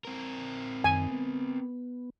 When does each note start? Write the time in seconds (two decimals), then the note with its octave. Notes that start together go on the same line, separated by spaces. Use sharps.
0.05 C4 A#4
0.84 F#2 D#3 G#5
1.11 B3